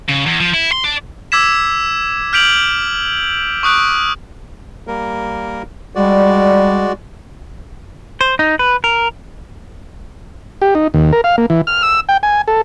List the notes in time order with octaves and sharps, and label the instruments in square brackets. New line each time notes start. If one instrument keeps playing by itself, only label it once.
[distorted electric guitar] C#3
E2
F3
E4
C6
D4
[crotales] D6 E6 G#6 B6 E7
F6 G6 B6 D7 F7 F#7
C#6 D#6 F#6 D7
[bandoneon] G3 A#3 A#4
[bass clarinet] G3 [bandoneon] G#3 F#4 D5
[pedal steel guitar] C5
D#4
B4
A#4
[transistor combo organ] G4
D#4
D#2
A#4
F5
A#3
E3
F6
E6
G5
G#5
A4